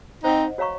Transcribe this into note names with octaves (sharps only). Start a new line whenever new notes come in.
C4 D#4 C5 D#5 F#5
F#4 C#5 F5 A#5 C#6